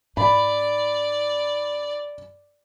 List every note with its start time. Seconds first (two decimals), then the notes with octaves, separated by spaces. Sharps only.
0.17 G#2 A3 D5 B5